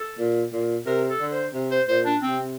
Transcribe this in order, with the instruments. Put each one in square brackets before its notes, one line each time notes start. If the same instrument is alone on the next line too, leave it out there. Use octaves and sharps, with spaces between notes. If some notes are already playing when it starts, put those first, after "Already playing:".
Already playing: [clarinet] A4
[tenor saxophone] A#2
A#2
[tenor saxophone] C3 [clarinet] A#4
[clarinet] A4
[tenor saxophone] D3
[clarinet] C5
[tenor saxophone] C3
[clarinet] C5
[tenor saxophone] A#2 [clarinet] C5
[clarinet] D4
[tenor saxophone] C3 [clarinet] C4